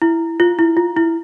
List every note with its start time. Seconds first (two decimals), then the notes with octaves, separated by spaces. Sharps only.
0.02 E4
0.40 F4
0.59 E4
0.77 F4
0.97 E4